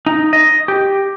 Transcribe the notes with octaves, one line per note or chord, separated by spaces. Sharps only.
D#4
D#5
G4